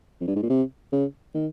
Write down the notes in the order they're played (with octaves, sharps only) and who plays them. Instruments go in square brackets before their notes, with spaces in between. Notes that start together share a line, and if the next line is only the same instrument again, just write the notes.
[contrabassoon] F2
G2
G#2
A#2
C3
C#3
D#3